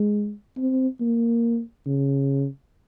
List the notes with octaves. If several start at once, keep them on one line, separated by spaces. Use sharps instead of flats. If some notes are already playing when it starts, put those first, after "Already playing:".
Already playing: G#3
C4
A#3
C#3